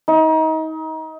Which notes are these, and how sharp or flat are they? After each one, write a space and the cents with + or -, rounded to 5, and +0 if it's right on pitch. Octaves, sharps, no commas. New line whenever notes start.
D#4 +30